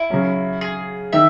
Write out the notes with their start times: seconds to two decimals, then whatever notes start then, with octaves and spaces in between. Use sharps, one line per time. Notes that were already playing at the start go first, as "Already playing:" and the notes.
Already playing: E4
0.10 C#3 F#3 C#4
0.61 G#4
1.12 D#3 E5